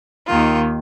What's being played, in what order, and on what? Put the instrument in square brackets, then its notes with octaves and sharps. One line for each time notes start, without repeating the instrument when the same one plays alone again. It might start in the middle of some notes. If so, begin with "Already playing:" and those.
[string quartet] D#2 D#3 A#3 F4